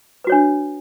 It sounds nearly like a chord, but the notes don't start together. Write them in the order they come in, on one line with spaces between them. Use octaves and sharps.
B4 F#4 C#5 D4